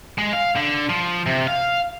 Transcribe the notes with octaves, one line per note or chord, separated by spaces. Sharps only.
G#3
F5
D3
F3
C3
F5